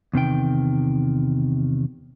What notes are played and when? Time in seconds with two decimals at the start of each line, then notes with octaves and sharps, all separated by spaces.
0.13 E2 C3 D#3 G5